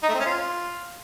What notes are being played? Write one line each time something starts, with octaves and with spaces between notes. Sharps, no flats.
D#4
A3
C4
C#4
F4